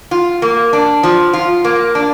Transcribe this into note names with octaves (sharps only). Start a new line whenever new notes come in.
F4
A#3
D4
F3
F4
A#3
D4